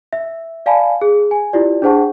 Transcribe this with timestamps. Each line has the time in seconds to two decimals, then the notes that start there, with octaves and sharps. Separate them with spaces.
0.13 E5
0.66 D5 F5 G#5 A5 B5
1.01 G#4
1.31 G#5
1.53 E4 F4 G4 D5
1.82 D4 G#4 C5 F#5 A5 C#6